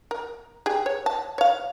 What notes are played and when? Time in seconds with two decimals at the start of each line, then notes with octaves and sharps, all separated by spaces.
0.11 A#4
0.66 G4 G#4
0.86 C#5
1.06 A5
1.38 C#5 F5